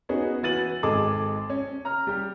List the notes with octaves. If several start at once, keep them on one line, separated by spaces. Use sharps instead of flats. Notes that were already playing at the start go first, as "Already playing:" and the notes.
B3 C#4 D#4 F#4 G#4
E3 E4 F#4 A6 D#7 F#7
G#1 G#3 G#4 A4 D6
C#4
A#5 F6
G3 G4